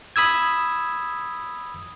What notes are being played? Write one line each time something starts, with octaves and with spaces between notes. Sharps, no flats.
B5 D#6 E6 G#6